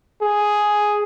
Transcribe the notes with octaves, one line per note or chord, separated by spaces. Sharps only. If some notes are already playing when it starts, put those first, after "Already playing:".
G#4